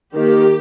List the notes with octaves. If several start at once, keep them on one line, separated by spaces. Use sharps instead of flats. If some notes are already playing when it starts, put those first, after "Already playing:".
D#3 A#3 G4